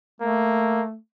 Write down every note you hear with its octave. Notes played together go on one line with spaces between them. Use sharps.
A3 A#3